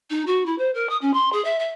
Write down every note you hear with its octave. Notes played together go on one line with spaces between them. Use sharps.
D#4
F#4
E4
C5
A#4
D#6
C#4
C6
G#4
E5
E5